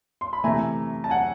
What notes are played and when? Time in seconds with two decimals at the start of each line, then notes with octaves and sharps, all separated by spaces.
0.21 C6
0.33 B5
0.44 C3 E3 A3 G#5 A#5
1.04 A5
1.10 F#5 G#5